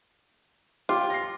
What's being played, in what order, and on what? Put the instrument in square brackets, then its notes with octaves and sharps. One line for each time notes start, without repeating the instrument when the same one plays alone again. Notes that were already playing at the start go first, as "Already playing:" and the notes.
[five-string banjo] F4 [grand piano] G4 D6
[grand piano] A#6 C7